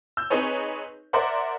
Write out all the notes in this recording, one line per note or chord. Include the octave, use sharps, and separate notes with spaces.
E6 G6
C4 D#4 G#4 B4 C#5
A#4 C5 D5 E5 F#5